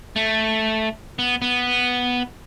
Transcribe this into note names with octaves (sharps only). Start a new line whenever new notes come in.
A3
B3
B3